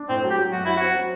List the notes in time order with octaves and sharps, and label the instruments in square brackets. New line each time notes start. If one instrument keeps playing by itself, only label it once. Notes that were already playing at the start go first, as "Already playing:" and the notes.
Already playing: [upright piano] D4
[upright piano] A2 [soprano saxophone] C4
[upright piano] F#3
[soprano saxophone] G4
[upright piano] F#3
[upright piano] F#2 [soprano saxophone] F#4
[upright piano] F#3 [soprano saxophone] E4
[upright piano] C4 [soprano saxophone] F#4
[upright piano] F#3